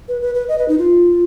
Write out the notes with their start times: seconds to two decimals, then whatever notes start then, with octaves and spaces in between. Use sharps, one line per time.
0.08 B4
0.22 B4
0.35 B4
0.48 D#5
0.58 B4
0.68 D#4
0.78 F4